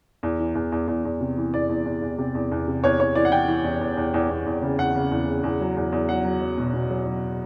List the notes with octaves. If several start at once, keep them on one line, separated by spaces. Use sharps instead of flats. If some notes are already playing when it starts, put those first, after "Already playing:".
E2
E3
E2
E2
E2
E2
C3
E3
E2 D5
E2
E2
E2
C3
E2
E2
C3
E2 C#5
E2 C#5
E3 D5
F#5
E3 G5
E3
E2
E2
E2
E2
E2
E2
C#3
E2 F#5
C#3
E2
C#3
E2
F#3
E2
E2
F#3 F#5
F#3
F#3
B2
B2
F#3
F#3